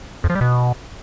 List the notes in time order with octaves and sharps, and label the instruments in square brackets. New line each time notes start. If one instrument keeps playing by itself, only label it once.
[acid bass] F2
F3
G3
B2